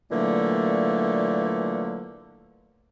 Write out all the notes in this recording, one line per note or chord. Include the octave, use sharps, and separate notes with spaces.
A#2 D3 E3 F#3 A3 A#3